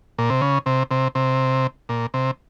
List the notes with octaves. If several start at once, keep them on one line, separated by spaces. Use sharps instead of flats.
A#2
C3
C#3
C3
C3
C3
A#2
C3